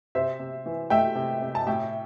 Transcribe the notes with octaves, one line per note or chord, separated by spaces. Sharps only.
C3 C5 E5
C3
E3
A3 E5 G5
C3
C3
A5
A2 E5 G5